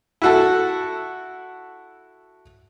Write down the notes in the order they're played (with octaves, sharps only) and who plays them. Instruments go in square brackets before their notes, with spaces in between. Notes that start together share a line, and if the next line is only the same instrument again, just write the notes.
[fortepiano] E4 F#4 A4